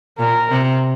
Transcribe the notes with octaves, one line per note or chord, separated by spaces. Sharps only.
A#2 A#4
C3